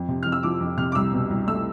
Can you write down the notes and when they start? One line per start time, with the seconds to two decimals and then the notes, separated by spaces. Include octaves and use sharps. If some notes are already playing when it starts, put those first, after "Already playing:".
Already playing: F2
0.08 C3
0.23 F2 F6
0.32 E6
0.43 F3 D6
0.60 F2
0.78 C3 F6
0.92 D6
0.95 C2 E6
1.13 B2
1.30 C2
1.47 A3 E6